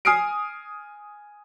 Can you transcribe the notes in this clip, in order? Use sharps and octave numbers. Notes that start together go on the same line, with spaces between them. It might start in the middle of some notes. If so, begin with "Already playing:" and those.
G#5 D#6 F6 C7 D7